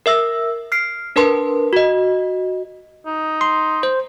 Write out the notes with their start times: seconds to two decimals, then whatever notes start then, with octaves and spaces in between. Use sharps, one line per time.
0.06 A#4 E5 E6 A#6
0.72 F6 C7 D7
1.16 D4 A#4 B4 A5 C6
1.73 F#4 D#5
3.06 D#4
3.41 C6
3.83 C5